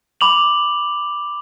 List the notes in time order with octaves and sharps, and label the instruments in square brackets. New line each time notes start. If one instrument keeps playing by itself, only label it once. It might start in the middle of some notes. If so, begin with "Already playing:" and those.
[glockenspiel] B5 D6 F7 F#7